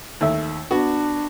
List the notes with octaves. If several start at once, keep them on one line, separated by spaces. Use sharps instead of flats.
D#2 A3 E5
B3 D4 F#4